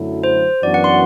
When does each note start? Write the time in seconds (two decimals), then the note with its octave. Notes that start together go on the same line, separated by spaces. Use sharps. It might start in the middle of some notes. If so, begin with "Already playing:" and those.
Already playing: F#2 D3 F#3 A3 E4
0.24 C5
0.63 F#2 E3 B3 D4 F#4 D5
0.74 F#5
0.84 C6